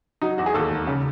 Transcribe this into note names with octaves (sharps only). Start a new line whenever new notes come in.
F#3 D#4
E2 F#4
G#4
D#2 A4
E1
C#3